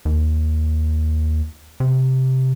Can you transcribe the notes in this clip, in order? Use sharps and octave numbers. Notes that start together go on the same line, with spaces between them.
D#2
C3